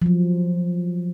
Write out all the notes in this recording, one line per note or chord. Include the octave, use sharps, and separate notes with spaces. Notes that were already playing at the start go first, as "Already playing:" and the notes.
F3 F#3